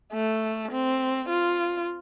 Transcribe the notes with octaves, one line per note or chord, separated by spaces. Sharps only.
A3
C4
F4